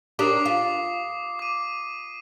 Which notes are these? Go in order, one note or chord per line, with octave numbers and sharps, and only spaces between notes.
D4 G4 A#4 D6 D#6 C7
F4
D6 D#7